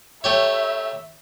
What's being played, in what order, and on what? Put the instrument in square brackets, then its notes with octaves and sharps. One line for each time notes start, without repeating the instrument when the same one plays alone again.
[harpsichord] A3 G4 C#5 [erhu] E5